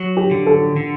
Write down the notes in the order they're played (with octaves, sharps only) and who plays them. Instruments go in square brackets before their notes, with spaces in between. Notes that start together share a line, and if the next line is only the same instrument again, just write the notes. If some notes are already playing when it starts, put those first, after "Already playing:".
Already playing: [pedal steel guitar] F#3
[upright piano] G4
[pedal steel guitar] D3
[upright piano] A4
[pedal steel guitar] D3